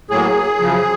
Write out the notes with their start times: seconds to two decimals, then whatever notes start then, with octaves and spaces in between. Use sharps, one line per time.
0.10 A2 F#3 A#3 G#4
0.59 F#2 C#3 F3